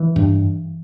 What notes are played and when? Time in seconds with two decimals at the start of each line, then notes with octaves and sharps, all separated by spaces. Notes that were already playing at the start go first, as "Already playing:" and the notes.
Already playing: E3
0.16 G2